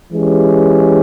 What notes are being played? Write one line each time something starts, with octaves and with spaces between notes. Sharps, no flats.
E3 G#3 C#4 G4